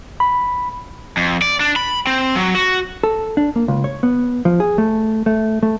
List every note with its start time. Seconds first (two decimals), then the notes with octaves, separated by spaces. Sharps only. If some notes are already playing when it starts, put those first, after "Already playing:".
0.20 B5
1.17 F2
1.42 D5
1.60 D4
1.76 B5
2.07 C4
2.35 F#3
2.55 F#4
3.03 A4
3.37 D4
3.56 A#3
3.68 C#2
3.84 C#5
4.03 B3
4.45 F3
4.60 G#4
4.78 A3
5.26 A3
5.63 A3